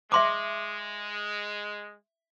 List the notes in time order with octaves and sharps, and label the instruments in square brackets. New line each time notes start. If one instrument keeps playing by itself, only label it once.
[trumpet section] G#3 [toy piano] E5 C6 D6